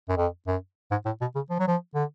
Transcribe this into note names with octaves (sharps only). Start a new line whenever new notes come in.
F#2
F2
F#2
G#2
A2
B2
C#3
F3
F#3
F3
D3